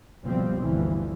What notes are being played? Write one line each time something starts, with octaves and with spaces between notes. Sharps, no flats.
F#1 B1 B2 F3 G3 C4
G1 D2 E3 F3